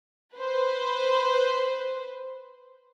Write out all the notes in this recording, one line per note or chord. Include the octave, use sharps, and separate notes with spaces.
B4 C5